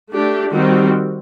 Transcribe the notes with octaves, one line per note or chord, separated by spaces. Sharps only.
A3 D4 G4
D#3 G3 C4 F#4